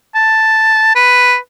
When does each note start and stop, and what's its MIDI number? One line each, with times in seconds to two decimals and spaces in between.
0.15 0.91 81
0.95 1.36 71